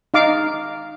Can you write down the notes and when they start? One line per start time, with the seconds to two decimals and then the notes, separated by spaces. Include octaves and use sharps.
0.14 D#4 F5 D6